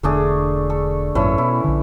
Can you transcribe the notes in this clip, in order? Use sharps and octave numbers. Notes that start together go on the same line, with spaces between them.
E1 D3 A3 D4 G#4
A4
G#1 F#2 A#2 E3 C#4 A4
B2 E4
A#1 D3